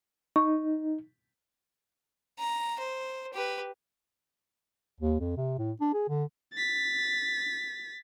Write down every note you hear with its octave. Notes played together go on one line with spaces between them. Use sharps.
D#4 C#6
A#5
C5
G4 B4
D#2
F2
C3
A2
D4
G#4
D3
A6 B6